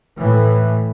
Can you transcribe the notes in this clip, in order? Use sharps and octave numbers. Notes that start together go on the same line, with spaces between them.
A2 E3